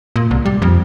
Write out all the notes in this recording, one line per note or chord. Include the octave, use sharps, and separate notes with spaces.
A#2
C2
G3
F2